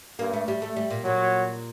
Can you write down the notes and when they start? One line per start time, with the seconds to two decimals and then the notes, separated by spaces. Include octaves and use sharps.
0.19 G2 A#3
0.33 A3
0.48 G3
0.62 A3
0.76 G3
0.90 A#2
1.04 A#2 F#3